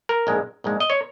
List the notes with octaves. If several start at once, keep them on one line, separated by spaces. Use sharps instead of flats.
A#4
A#1 G#2 G#3
A#1 G#2 G#3
D#5
C#5